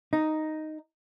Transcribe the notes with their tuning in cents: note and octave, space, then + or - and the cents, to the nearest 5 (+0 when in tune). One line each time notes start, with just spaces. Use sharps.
D#4 +0